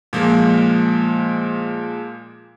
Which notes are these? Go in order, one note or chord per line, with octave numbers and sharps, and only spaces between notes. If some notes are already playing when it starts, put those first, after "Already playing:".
A#2 F3 G#3 A#3